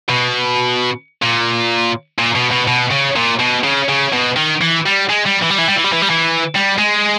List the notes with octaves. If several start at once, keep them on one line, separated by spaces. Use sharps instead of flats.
B2
A#2
A#2
B2
B2
B2
C#3
A#2
B2
C#3
C#3
B2
D#3
E3
G3
G#3
G3
E3
G3
E3
G3
E3
G3
E3
G3
E3
G3
G#3